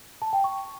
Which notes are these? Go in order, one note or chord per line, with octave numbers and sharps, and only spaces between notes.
A5
G5
C#6